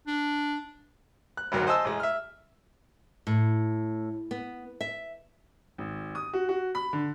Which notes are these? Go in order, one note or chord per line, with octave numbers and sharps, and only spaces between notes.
D4
F#6
G#1 D2 F#3 A#4
C5 D#5 G#5 A5 E6
A1 G#3
E5 F6
A2
B3
E5
G#1
D#6
F#4
F#4
B5
D3